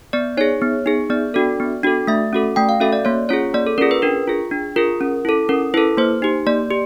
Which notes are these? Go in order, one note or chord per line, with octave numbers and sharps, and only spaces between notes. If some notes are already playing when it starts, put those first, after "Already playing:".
B3 D5
D#4 G#4 C#5
B3
D#4 G#4
B3 D5
D4 F#4 A4
B3
D4 F#4 A4
A3 E5
C#4 F#4 A4
A3 G5
F5
C#4 F#4 A4 E5
D5
A#3 C#5
C#4 F4 G#4 C#5
A#3 D5
A4
C#4 F4 G#4 A#4
B4
D4 A#4
F4 G#4
D4
F4 G#4 A#4
C#4
E4 A4
C#4 A#4
E4 A4 B4
A#3 C5
D#4 G4
A#3 D5
G4